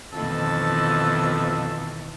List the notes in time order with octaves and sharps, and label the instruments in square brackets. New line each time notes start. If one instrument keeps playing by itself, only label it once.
[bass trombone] F2 [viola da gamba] B2 D#3 E3 [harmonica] E5 A5 E6